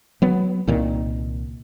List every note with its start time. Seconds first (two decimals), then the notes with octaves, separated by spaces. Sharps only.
0.22 F#3 B3
0.68 C2 A#2 D#3